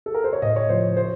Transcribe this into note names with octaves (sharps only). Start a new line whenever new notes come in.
A4
A#4
C5
C#5
A2 D#5
C#5
F3 C5
C5